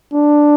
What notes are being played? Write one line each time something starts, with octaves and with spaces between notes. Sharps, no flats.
D4